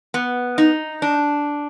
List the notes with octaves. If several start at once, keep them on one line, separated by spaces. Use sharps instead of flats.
B3
D#4
D4